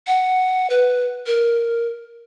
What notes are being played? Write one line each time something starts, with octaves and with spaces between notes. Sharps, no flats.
F#5
B4
A#4